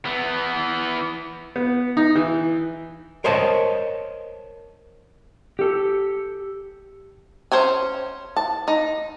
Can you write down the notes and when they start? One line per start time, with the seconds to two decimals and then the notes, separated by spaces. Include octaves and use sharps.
0.05 E3 B3
1.56 B3
1.97 D#4
2.15 E3
3.24 A#4 C5 C#5 D#5 A5
5.59 G4 A4
7.52 C#4 C5 C#5 G#5
8.37 A5
8.68 D#4